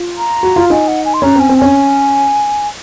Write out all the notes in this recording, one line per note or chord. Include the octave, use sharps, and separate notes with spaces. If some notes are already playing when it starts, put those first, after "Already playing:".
Already playing: F4
A#5
F#4
F4
D#4 G#5
F#5
G#5
C6
C#4 A#5
C4 G#5
C4
C#4 G#5